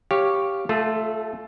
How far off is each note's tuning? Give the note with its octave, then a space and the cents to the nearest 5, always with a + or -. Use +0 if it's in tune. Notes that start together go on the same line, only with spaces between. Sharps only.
G4 +0 C#5 -5 F5 +0
A3 +0 F4 +0 A4 -40